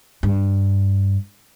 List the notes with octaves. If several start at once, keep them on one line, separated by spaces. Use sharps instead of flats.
G2